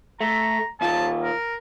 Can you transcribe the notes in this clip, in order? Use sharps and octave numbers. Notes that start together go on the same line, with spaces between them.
A3 A#5
D#2 F4 A5
A#4